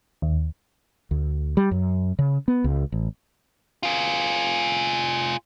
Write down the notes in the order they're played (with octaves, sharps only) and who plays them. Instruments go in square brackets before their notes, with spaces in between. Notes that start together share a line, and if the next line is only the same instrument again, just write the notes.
[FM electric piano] D#2
[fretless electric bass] D2
G3
F#2
C#3
B3
C#2
A1
[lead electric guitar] F4 G#4